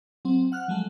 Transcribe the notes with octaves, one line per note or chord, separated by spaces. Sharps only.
F#3 C4
F#5 F6 F#6
F3 F#3 G#3 A3